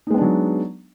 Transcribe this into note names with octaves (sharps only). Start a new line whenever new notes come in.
F#3 G#3 B3 D4 D#4